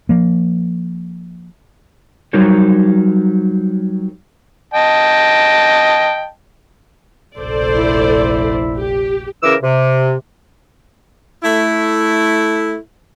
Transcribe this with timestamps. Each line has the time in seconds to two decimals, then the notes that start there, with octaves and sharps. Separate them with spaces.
0.09 F3 A#3
2.33 F#3 G3 D#4 A#4 C5 C#5
4.74 D#5 G5 A5
7.38 F1 A#1 A4 C5 D5
7.75 E4
8.78 G4
9.43 C#3 E3 A#4 D6 E6
9.62 C3
11.44 A3 E4